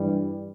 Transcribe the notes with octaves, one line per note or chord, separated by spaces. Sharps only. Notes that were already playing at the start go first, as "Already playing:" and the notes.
Already playing: G2 E3 G3